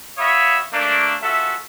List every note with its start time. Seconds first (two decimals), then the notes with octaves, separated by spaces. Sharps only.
0.18 F#4 C#5 E5 F5 B5 D#6
0.73 A3 A#3 D4
1.23 C#4 F4 F#4 A4 E5